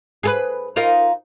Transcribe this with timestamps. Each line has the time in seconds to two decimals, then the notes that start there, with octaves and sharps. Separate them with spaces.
0.23 G#4 A4 B4
0.76 D#4 F4 A#4